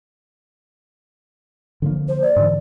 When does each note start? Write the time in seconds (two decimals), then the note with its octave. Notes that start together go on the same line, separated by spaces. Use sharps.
1.82 D3 F3 A#3
2.08 C5
2.22 D5
2.36 G#2 D3 E3